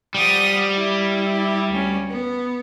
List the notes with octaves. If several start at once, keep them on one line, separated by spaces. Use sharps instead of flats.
F3 G3 F#5 D#6
E4
D2 C#4
B3